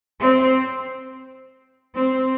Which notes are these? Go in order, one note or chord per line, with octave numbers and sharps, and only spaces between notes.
C4
C4